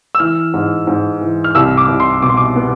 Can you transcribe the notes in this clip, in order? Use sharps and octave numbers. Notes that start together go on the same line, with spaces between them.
E6
E3 F6
G#2
G#2
E3
F6
C2 E6
D6
C2
C6
B2 D6
C6
D6
B3